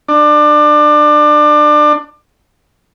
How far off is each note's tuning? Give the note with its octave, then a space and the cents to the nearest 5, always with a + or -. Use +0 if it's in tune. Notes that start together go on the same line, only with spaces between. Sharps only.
D4 +25